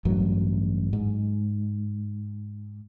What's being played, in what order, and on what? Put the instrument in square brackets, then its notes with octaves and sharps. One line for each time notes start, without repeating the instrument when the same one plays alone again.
[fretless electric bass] A1 G2 F#3
G#2